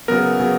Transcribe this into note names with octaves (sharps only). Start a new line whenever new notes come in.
C#3 F#3 B3 A#4
C#3 F#3 B3